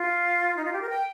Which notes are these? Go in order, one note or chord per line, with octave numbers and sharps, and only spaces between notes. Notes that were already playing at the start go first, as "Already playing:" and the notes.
Already playing: F4
D#4
F4
G4
A#4
G5